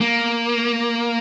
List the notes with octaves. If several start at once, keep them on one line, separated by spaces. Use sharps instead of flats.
A#3